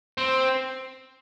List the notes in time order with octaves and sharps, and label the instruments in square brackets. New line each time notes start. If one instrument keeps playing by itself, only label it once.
[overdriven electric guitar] C4